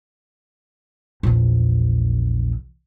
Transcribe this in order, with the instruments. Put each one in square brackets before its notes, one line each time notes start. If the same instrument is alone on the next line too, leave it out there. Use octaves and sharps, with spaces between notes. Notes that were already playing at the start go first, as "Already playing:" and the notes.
[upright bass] A#1 E2